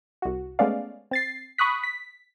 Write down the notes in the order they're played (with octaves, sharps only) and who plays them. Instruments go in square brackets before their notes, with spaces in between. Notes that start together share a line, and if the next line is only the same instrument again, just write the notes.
[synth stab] C2 F#4
G#3 A3 B3 C#4 D5 F5
C4 A6 C7
B5 C#6 D#6 F#6 B6
B6